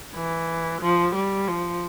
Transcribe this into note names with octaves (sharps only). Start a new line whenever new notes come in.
E3
F3
G3
F3